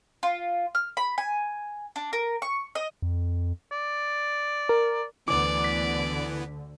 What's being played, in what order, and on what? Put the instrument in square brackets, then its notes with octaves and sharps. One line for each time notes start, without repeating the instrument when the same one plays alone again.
[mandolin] F4
F6
B5
G#5
D4
A#4
C#6
D#5
[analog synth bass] F2
[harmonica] D5
[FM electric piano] A#4
[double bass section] D2 D3 [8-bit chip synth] E3 B3 [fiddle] D5 [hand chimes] D6
[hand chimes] B6